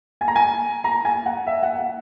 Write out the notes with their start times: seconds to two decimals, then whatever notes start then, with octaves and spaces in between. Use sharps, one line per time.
0.21 G#5
0.28 A#5
0.36 G#5
0.84 A#5
1.05 G#5
1.26 F#5
1.47 E5
1.63 F#5
1.78 F#5